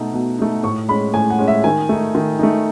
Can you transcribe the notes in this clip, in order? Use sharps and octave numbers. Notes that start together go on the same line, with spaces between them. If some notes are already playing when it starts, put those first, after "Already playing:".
Already playing: B2 A3 D#4
B2
A3 D#4
A2 C#6
G#3 C#4 B5
A2 G#5
F#5
G#3 C#4
E5
D#3 G#5
A3 D#4
D#3
A3 D#4